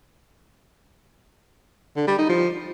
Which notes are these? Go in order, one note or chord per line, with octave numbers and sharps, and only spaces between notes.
D3
G3
D#4
F3